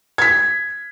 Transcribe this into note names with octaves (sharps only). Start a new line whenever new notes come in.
G#6 B6